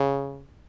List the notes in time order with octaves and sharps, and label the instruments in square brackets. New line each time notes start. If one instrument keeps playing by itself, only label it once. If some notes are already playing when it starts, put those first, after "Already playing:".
Already playing: [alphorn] C#3